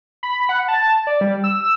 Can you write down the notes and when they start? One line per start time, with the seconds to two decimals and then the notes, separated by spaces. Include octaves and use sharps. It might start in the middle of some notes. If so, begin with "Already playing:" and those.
0.23 B5
0.49 F#5
0.68 A5
1.07 D5
1.21 G3
1.44 E6
1.61 E6